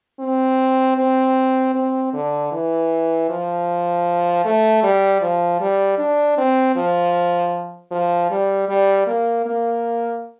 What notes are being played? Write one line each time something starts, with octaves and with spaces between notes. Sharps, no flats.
C4
C4
C4
D3
E3
F3
A3
G3
F3
G3
D4
C4
F3
F3
G3
G3
A#3
A#3